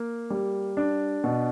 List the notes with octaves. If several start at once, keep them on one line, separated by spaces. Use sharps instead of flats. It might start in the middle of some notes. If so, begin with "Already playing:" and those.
Already playing: A#3
G3
D4
B2